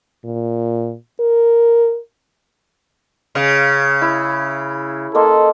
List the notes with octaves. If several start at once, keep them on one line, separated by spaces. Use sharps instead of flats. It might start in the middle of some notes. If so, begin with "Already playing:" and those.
A#2
A#4
C#3 F5
E4
A#3 A4 D#5 C6